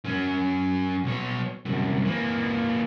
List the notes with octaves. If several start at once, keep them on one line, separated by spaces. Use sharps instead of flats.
F#2 C#4
B1 C#5
C2 F#2
E3 A#3